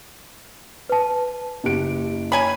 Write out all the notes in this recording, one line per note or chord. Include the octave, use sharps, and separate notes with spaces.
B4 A5
F#1 G4 D7
C#4 C#5 G#5 A#5 B5